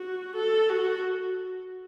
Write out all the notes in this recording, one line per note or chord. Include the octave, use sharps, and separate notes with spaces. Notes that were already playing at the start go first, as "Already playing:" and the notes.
Already playing: F#4
A4
F#4